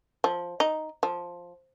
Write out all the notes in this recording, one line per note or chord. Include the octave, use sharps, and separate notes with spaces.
F3
D#4
F3